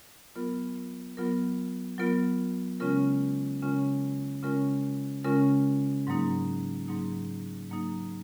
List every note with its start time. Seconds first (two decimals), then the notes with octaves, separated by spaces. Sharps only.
0.36 F#3 B3 F4 A#4
1.17 F#3 B3 F4 A#4
1.98 F#3 B3 F4 A#4
2.80 C#3 G#3 C#4 F4 A#4
3.62 C#3 G#3 C#4 F4 A#4
4.43 C#3 G#3 C#4 F4 A#4
5.24 C#3 G#3 C#4 F4 A#4
6.07 G#2 F#3 A#3 D#4
6.88 G#2 F#3 A#3 D#4
7.69 G#2 F#3 A#3 D#4